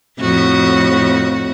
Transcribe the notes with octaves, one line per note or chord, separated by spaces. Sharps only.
F2 A2 F#4